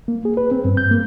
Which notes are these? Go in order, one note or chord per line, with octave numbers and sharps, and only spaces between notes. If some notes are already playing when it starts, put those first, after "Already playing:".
A#3
G#4
B4
C4
G2
G6
A#3